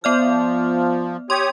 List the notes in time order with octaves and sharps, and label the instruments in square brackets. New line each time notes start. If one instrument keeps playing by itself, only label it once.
[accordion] F3 [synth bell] B3 D5 F6
[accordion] G4 C#5 D#6 [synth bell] C6